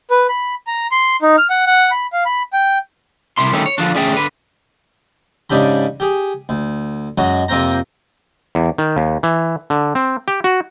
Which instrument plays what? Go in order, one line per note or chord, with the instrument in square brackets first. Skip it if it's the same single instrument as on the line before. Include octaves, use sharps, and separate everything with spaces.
[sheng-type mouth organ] B4
B5
A#5
C6
D#4
F6
F#5
F#5
B5
F5
B5
G5
[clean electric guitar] C2 C3 E4 C6
D3 D#3 G3 A3 C#4
C#5
D3 F3 F#3 D4
D2 C#4 G#4 D5 E5 G5
D3 B4
[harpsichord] G#2 C#3 D4 G4 B5
G4 G#4
D2
F#2 F#3 G#3 F#4
F2 C3 A#3 C4 G5 A#5
[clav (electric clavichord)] E2
D#3
D#2
E3
D3
C4
G4
F#4